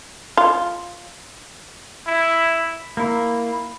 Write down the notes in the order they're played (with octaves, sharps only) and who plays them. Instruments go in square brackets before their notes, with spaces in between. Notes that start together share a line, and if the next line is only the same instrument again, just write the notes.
[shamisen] F4
[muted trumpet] E4
[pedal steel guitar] A#3 E4